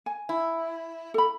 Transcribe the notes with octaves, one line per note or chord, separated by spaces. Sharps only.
G#5
E4
A4 B5